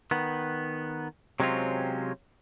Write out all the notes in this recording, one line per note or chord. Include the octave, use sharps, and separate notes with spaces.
D#3 B3
C3 F#3 G#3 C4 C#4 F4